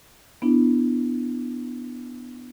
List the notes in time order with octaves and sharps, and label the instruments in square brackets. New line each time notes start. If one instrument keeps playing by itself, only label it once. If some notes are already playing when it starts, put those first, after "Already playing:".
[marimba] B3 D4 E4